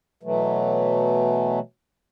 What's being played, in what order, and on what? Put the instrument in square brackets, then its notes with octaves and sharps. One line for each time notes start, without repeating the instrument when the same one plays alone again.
[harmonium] B2 E3 F#3 A3